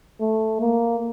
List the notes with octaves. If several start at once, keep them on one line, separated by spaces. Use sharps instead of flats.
A3
A#3